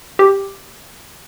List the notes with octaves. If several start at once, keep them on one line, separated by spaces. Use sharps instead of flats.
G4